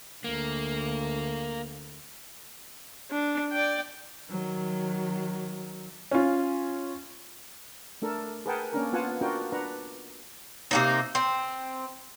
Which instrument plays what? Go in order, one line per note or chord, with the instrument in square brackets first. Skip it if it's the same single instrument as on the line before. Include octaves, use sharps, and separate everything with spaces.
[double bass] D2 [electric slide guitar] A#3
[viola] D4
D5 G5
[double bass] D#3 F#3
[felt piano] C#4 F4
[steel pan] A3 D4 A4 A#4
G#4 A#4 B4 F#5 G5 A5
A#3 C#4 D4 A#4
B3 F4 F#5 G#5 A5
D4 F4 F#4 A#4 G5
D4 B4 F#5 A#5
[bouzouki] C3 A#3 D#4
C4